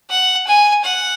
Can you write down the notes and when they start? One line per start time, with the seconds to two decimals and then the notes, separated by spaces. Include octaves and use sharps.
0.10 F#5
0.47 G#5
0.84 F#5